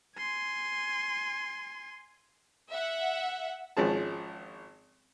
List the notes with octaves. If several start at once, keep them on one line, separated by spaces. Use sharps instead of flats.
G#5 C6
E5 F#5
G#1 F3 C#4 G#4 A5